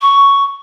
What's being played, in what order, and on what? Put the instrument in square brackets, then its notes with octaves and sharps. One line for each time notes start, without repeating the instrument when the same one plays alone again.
[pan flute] C#6